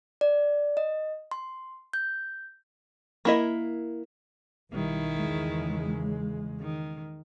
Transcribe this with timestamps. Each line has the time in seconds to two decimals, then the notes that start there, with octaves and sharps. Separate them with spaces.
0.21 D5
0.77 D#5
1.31 C6
1.93 G6
3.25 A#3 E4 D#5
4.74 B1 D#3 G3 E4
5.11 E2 C#3 G#3
6.61 D#3